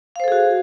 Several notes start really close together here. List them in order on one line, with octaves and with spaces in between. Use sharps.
F5 C5 A4 G#4 F#4